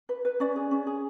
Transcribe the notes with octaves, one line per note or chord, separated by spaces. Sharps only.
B4
B4
C#4 D5
G#4
C#4
G#4